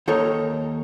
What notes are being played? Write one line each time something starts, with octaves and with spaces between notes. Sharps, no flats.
D#2 D#4 A4 A#4 C#5